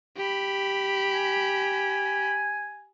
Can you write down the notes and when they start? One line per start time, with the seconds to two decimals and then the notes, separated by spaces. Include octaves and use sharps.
0.17 G4 B5
1.13 G#5